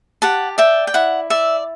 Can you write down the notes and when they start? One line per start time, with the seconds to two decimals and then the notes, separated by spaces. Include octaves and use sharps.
0.22 G4 F#5 A5
0.58 D5 E5 G5
0.87 G5
0.94 E4 F#5
1.30 D5 E5